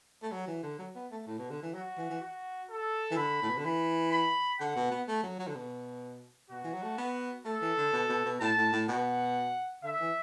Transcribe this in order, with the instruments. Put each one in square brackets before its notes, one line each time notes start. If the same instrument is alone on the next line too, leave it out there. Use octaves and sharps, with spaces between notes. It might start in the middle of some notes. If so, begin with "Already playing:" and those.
[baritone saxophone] A3
F#3
E3
D3
F#3
B3
A3
A2
B2
D3
E3
[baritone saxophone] F#3 [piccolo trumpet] F#4
[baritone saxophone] E3
E3
[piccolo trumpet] F#4
A4
[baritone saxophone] E3
[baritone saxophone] D3 [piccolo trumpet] B5
[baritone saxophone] A2
B2
D3
[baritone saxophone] E3 [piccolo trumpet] B5
[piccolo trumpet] B5
[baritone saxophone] D3 [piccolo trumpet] F#5
[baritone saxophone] B2
B3
A3
F#3
F#3
D3
B2
[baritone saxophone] B2 [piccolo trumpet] F#4
[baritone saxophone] E3
F#3
A3
B3
[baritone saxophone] A3 [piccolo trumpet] A4
[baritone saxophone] E3
D3
B2
B2
B2
[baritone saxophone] A2 [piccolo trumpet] A5
[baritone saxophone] A2
A2
[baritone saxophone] B2 [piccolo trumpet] F#5
[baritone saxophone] D3 [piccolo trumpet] E5
[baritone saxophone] E3